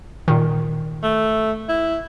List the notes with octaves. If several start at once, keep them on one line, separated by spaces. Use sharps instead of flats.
A#2 D#3
A3
E4